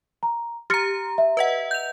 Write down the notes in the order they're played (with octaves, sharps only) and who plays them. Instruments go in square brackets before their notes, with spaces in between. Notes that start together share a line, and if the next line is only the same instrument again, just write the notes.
[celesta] A#5
[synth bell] G4 A#5 [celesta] F6 A6 C#7
[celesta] E5
[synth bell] B4 D#5 F#5
G6 F7